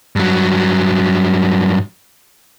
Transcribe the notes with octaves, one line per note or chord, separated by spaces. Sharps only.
G2 F#3